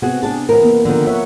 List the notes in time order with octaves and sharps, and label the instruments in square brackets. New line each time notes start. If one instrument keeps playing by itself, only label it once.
[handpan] C3 B3 C4 [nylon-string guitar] F#4 G#4
[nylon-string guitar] D4 A5 [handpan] G#4
[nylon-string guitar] E2 G2 A#4
[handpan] A#3 B3
[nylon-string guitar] D3 D#3 [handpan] F3 A#4
[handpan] C#5 F#5 [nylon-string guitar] E5